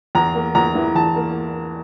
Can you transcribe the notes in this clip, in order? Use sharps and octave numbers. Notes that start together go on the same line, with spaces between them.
E2 A#5
A#3
E2 A#5
E3
E2 A5
A#3